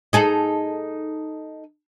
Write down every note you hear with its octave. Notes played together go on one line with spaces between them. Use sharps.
D#4 G#4 A4